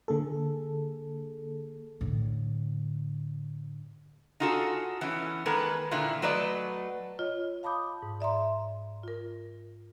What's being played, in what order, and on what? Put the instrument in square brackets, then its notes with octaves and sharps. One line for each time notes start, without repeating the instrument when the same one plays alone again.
[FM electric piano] D3 A#3 G#4 A4
[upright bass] A2 D3
[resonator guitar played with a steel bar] D#4 F4 F#4 G#4 A4
E3 B3 C#4
D#3 G#3 A#3 A4 B4
A#2 D3 D#3 E4 F4
F#3 A3 B4 D5 D#5
[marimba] F4 C#5 D#5
F5 A5 B5 D6 D#6 G6
G#2
D5 E5 A#5 C6
F4 A#4